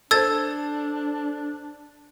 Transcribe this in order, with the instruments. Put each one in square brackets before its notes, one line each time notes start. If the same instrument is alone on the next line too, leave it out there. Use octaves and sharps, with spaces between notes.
[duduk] D4 [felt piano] A4 C5 [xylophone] E6 G#6 A6